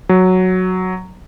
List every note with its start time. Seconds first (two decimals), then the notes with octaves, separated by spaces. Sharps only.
0.09 F#3